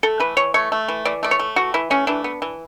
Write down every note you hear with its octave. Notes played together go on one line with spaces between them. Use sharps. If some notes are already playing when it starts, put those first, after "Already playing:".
A3 A4
E3 B4
E3 C#5
A3 C#5
A3
E3
E3 D5
A3 D5
C#5
A3
E3 F#4
E3 E4
A3 C#4
E3 D4
B3
E3